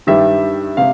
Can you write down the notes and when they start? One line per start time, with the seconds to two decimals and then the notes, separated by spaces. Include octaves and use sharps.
0.07 G2 D#3 G3 E5
0.77 C3 F5